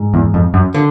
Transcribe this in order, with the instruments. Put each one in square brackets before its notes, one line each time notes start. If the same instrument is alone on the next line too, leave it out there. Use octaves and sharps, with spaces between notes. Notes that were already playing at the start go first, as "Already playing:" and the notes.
Already playing: [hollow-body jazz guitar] G#2
[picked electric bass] E2
F2
F#2
[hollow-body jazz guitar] D3